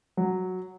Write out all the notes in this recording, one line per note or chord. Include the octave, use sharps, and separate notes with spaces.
F#3